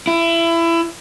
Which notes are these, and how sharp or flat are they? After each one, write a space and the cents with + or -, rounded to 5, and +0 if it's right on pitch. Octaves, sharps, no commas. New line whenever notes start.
E4 +25